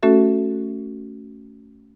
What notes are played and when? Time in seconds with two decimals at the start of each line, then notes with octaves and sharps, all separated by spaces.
0.03 A3 C#4 F#4 A4 E5